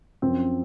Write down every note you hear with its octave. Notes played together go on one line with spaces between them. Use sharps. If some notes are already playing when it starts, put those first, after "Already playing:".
F#2 F3 C4